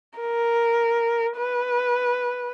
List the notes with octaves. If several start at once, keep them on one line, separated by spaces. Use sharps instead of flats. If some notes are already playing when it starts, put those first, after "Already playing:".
A#4
B4